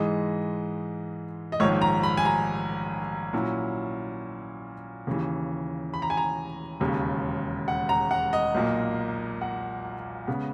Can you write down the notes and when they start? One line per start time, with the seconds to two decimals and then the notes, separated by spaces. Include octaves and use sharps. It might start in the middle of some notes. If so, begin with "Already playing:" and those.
Already playing: G#2 E3 G#3 D#5
1.52 D#5
1.60 A#1 G#2 D#3 C#5
1.81 A#5
2.03 B5
2.17 G#5
2.25 A#5
3.33 A#2 F#3 C#4 E4
5.07 D#2 C#3 E3
5.94 B5
6.02 A#5
6.10 G#5
6.17 A#5
6.80 E1 D#2 C#3
7.68 F#5
7.89 A#5
8.11 F#5
8.33 D#5
8.55 B1 A#2 A#3
9.41 F#5
10.27 C#3 G#3 B3